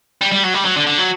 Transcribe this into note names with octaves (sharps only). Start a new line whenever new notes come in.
G3
G3
F#3
G3
F#3
D3
D3
F#3